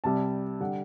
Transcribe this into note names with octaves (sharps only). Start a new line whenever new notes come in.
C2 C3 G3 A5
D3 G3 F#5